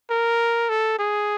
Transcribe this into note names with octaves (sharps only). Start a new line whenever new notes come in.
A#4
A4
G#4